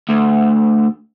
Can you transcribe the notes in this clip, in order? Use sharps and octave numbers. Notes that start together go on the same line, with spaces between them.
D2